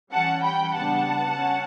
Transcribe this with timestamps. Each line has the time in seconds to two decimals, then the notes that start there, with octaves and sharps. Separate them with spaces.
0.12 E3 G3 C#4 F#5 A5
0.43 G5 B5
0.73 C#3 G3 B3 D4 F#5 A5
1.35 C#4